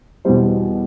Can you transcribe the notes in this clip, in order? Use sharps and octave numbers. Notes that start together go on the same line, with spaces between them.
E2 B2 G3 C5